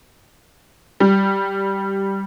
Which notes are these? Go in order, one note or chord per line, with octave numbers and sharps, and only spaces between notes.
G3